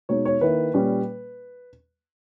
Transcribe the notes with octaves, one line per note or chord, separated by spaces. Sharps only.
B2 G#3 D#4 C#5
C#5
D#3 A#3 E4 B4
A#2 G3 C#4